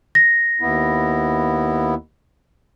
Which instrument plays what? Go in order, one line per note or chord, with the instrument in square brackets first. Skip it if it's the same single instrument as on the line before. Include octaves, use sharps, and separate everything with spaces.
[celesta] A#6
[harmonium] D#2 B3 E4